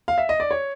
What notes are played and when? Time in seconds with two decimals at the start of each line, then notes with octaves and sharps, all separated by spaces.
0.08 F5
0.18 E5
0.29 D#5
0.40 D5
0.51 C#5